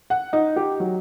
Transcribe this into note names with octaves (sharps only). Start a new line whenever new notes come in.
F#5
D#4
G4
F#3